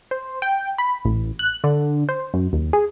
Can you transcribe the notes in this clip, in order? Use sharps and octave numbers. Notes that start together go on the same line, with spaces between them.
C5
G5
B5
A1
F#6
D3
C5
F#2
D#2
G#4